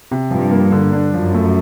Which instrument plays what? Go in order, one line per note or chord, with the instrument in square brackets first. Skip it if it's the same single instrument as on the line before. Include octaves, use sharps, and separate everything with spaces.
[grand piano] C3
[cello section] G2 [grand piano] F3
[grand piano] A#3
D3
D4
[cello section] F#2 [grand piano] F3
[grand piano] A3